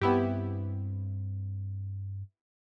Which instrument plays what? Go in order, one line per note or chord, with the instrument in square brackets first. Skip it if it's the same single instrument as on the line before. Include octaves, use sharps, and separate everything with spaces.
[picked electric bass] G2 C4 [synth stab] B3 E4 G4